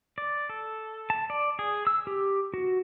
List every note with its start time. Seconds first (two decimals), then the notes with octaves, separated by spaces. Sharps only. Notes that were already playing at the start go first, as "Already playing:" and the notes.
0.18 D5
0.49 A4
1.10 A5
1.30 D5
1.59 G#4
1.87 E6
2.07 G4
2.54 F#4